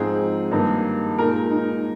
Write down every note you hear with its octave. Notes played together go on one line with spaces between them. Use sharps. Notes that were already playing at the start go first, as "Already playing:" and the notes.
Already playing: G#2 F3 C4 D#4 G#4
G2 D#3 A#3 D#4
A#2 G#3 D#4 A#4
D#4